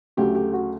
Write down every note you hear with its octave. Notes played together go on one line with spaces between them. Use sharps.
D2 C#3 F#3 A3 G4
G4
F#4